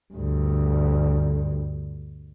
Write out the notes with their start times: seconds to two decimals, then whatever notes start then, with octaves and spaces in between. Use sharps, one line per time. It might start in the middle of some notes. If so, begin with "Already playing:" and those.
0.13 D2 G2